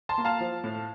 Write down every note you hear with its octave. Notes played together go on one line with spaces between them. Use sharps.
A5 C6
A#3
F5 A5
F3
A2